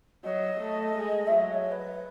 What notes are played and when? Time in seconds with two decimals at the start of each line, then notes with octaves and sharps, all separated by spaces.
0.24 F#3 D#5
0.60 A3
0.95 G#3
1.27 F#3 E5
1.40 D#5
1.54 C#5
1.68 C#5
1.71 B4